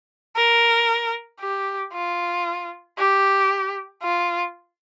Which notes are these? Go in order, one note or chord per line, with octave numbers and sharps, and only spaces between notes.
A#4
G4
F4
G4
F4